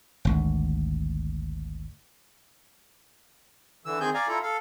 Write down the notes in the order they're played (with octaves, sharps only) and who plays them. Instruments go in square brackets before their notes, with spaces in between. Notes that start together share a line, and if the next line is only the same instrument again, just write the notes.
[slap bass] G#1 D2
[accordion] D3 E3 E6
D#3 C4 G#4 G#5 G6
D5 F5 G#5 A#5
E4 F4 A4 A#5
A4 F5